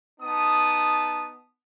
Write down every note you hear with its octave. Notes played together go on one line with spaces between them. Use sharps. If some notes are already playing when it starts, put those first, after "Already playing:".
B3 D#4 A5 D#6